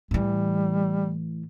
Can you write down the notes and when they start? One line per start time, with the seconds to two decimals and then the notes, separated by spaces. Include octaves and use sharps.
0.11 A2 E3 G3